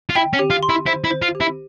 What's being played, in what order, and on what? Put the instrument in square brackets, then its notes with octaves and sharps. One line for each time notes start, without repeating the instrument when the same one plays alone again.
[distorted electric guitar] F4
[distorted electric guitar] E4 [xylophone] G5
[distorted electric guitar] C#4
[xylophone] G4
[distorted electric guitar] F4
[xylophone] C6
[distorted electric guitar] E4
[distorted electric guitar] E4 [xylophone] C5
[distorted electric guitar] E4
[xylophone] C5
[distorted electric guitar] F4
[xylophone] G4
[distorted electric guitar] E4